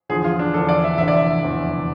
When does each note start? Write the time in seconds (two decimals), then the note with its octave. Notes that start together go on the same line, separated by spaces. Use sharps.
0.09 E2 D3 F3 G#4
0.24 F4
0.39 D4
0.54 E2 D3 F3 A4
0.69 D5
0.84 E5
0.98 F1 E2 D3 E5
1.08 D5
1.17 E5
1.42 F1 E2 D3